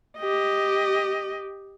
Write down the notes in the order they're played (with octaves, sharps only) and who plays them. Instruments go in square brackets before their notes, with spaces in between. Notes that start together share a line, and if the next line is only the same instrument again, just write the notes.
[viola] G4 D#5